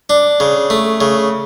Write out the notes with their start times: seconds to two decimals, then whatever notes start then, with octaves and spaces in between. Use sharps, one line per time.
0.10 D4
0.40 C#3
0.70 A3
1.01 C#3